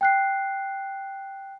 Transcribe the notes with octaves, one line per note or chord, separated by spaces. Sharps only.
G5 F#6 C7